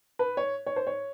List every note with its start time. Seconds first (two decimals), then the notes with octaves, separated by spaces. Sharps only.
0.19 B4
0.37 C#5
0.66 C#5
0.76 C5
0.87 C#5